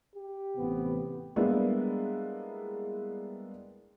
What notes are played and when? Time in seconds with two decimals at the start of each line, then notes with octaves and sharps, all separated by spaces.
0.15 G4
0.57 A1 C3 B3
1.36 G3 G#3 A#3 B3 D4 E4